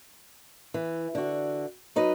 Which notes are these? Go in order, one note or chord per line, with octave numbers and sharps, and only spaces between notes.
E3
D3 F#4
F#3 D#4 B4 D#5